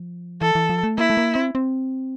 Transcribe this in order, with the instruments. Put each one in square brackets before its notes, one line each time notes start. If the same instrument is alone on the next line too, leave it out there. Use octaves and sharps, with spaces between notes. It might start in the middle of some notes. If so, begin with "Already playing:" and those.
Already playing: [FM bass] F3
[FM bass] E3 [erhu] A4
[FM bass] E3
F3
A3
[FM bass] A#3 [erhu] E4
[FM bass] A3
A#3
C4
C4